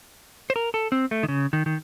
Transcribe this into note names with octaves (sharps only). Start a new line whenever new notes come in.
C5
A#4
A4
C4
A3
D#3
C#3
D#3
D#3